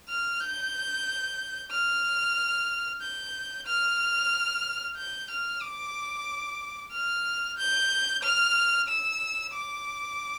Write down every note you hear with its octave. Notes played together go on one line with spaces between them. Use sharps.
F6
G6
F6
G6
F6
G6
F6
D6
F6
G6
F6
E6
D6